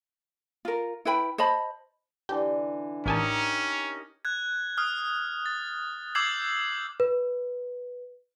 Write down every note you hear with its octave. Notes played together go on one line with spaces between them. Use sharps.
F4 A#4
E4 B4 G5 B5
C5 D#5 A5 B5
D3 E3 G4
A1 C#4 D#4 G4 A#4 G#5 A5
F#6 G#6
D#6 F6
A6
D6 E6 G6 G#6 C7 F#7
B4